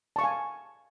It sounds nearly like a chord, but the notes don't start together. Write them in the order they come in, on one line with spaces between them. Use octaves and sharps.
A5 C#6 F5 G#5